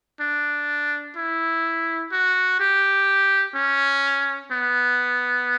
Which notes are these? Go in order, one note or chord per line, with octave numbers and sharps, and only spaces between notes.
D4
E4
F#4
G4
C#4
B3